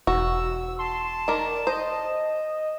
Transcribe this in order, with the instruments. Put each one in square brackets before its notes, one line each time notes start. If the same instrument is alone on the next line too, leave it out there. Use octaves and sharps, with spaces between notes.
[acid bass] E1 [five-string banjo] F#4 [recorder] E6
[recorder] A5 [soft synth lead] C6
[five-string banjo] D#3 A#4 [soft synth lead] D5
[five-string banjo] C5 [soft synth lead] D#5